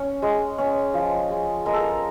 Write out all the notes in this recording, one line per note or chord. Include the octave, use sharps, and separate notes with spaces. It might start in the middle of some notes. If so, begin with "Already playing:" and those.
Already playing: C#4
G#3
C#4
F3
G#3
G#3 A#4
A4
A#4